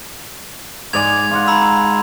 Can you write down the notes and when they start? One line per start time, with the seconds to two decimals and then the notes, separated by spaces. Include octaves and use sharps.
0.93 G#2 D5 G#5 G#6 F7
1.31 F4 D#5 F#5
1.47 A#5 B5 E6